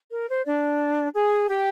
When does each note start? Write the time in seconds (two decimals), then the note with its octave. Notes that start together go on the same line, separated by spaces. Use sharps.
0.11 A#4
0.29 C5
0.45 D4 D5
1.15 G#4 G#5
1.50 G4 G5